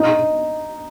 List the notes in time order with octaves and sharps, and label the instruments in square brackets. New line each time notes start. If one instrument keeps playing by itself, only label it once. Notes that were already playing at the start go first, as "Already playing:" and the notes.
Already playing: [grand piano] D#4